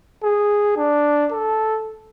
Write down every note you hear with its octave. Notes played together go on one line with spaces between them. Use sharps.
G#4
D4
A4